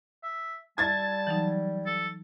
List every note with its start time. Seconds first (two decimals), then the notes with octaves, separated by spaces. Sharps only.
0.24 E5
0.78 G3 E5 A5 G#6 A6
1.27 E3 F#3 D#4
1.86 A4